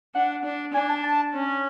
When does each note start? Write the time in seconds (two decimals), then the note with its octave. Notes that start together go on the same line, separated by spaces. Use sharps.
0.15 D4 F#5
0.44 D4
0.73 D4 G#5
0.89 A5
1.03 A5
1.34 C#4